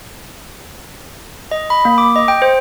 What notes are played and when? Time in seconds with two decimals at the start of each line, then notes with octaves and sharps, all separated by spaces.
1.51 D#5
1.70 B5
1.85 A#3
1.98 D6
2.16 D#5
2.28 G5
2.42 C5